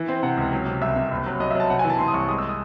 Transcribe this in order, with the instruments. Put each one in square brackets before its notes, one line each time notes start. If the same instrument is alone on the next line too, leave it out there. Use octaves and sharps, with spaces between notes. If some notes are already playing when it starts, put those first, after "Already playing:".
Already playing: [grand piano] E3
C4
C3 F#5
C#2
F#3
C3
C2 E5
C3
F#1
F#3
F#3 D#5
E5
F#3 A5
C3 F#5
G#5
E3 A5
C3 C6
D#6
C2 C#6
G#3 D#6
E6
D#6